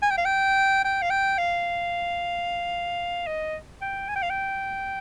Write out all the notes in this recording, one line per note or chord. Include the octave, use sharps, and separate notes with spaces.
G#5
G5
F5
G5
G5
F5
G5
F5
D#5
G5
G#5
G5
F5
G5